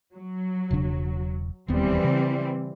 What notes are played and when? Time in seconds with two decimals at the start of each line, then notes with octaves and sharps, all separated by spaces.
0.15 F#3
0.71 E1 C#3 D4
1.68 E1 D#2 E3 G3 B3 C4
2.04 C#3